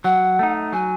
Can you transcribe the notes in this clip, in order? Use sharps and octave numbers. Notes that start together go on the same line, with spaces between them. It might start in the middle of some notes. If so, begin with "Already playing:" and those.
F#3 F#5
A3 D#4
F#3 G#5